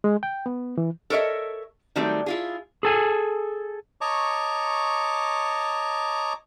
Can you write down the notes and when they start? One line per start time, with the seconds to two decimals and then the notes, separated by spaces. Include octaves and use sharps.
0.04 G#3
0.23 G5
0.46 B3
0.78 E3
1.10 A4 A#4 C#5 D#5 E5
1.96 D#3 F#3 G3 A3 C4
2.26 E4 F4 G#4
2.83 G#4 A4 G#5
4.01 C#5 D#5 A5 A#5 C#6 D6